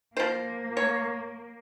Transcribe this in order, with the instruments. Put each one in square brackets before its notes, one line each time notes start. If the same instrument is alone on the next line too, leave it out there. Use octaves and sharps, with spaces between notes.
[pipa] F3 C5 [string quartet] A#3
[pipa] C#5